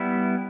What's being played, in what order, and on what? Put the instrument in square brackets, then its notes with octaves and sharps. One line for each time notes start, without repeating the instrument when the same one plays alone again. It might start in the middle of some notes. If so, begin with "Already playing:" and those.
Already playing: [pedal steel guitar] G3 B3 E4